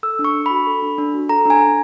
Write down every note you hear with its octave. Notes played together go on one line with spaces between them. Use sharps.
A4 E6
D4
C#6
D4
F#4 B5
A4
D4
D4
F#4
A4 A#5
D4 G#5
D4